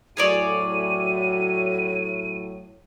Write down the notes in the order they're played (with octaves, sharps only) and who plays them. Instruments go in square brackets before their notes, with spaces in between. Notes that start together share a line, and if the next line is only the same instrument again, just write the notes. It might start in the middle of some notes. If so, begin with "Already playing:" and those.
[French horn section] A2 F#3 [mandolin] G#4 C#5 D5 [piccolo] D#7